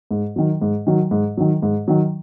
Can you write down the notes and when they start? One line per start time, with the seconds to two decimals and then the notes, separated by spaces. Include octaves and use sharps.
0.11 G#2
0.36 D#3 F#3
0.62 G#2
0.87 D#3 F#3
1.11 G#2
1.37 D#3 F#3
1.62 G#2
1.88 D#3 F#3